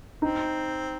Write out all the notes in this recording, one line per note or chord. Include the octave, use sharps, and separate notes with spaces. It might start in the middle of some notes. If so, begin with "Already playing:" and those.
C4 D#4